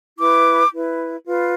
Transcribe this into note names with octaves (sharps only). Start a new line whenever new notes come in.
E4 B4 D6
E4 B4
F4 B4